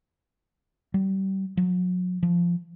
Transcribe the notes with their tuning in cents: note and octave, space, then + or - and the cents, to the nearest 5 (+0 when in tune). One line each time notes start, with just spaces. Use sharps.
G3 -30
F#3 -35
F3 -10